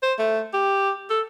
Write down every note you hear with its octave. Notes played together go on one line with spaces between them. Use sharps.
C5
A3
G4
A4